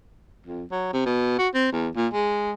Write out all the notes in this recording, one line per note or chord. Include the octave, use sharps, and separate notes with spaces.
F2
F#3
C3
B2
F#4
C4
E2
A#2
G#3